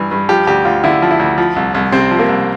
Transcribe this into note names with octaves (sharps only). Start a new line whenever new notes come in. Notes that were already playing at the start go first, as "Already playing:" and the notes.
Already playing: G2 E3
G2
F3 G4
D2 G4
D2 F4
D3 E4
F3
E4
D2
F3
C2
C2
C3 C4
F3
A#3
C2